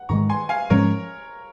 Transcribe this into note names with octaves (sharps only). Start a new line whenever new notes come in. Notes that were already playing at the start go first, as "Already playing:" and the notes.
Already playing: F#5
G#2 D#3 G#3 A#5 C#6
G#5 C6
F5 G#5
G#2 F3 G#3 C#4 A#4 C#5